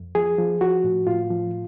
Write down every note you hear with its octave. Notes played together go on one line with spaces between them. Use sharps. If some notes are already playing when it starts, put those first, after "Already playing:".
Already playing: F2
F3 G#4
F3
F3 F#4
A2
A2 F4
F3